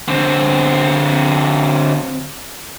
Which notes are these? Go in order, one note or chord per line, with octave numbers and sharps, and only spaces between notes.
D3 C4